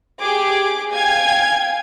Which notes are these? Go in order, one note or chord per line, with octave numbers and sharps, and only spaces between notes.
G4 G#4 D6
F5 G5 G#5 G#6